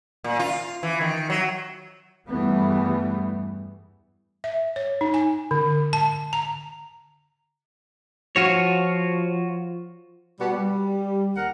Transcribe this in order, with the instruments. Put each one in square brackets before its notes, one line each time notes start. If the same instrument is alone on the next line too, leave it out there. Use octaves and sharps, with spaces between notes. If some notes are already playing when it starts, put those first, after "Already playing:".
[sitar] A#2
F4
E3
D#3
F#3
[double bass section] E2 G2 E3 G3 A3 B3
[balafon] E5
C#5
D#4
G#5
D3
A5
A#5
[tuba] F3 [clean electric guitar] F4 F#4 C#5
[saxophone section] B2 G3 B3 F#4
G3
D#2 A#4 F#5